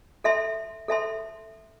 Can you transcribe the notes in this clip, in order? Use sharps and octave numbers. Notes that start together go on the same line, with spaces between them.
A4 E5 A5 C6
A4 E5 A5 C6